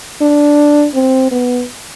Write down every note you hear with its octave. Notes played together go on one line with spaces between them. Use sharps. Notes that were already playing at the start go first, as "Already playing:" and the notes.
D4
C4
B3